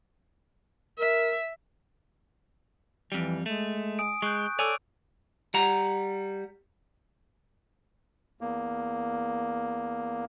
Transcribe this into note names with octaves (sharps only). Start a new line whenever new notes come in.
A#4 E5
F2 E3 G3
G#3 A3
G#5 D#6 D7
G#3 C#6 F#6 G6
A4 C#5 D5 G#5 D6 E6 D7
G3 F#5 A#5
E2 A#3